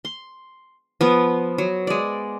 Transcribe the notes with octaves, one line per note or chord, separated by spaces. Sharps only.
C6
F3 B3
F#3
G#3 D5